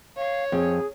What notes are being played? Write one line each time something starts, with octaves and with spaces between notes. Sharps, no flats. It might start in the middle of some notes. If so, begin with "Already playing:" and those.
C#5 F5
F2 G#4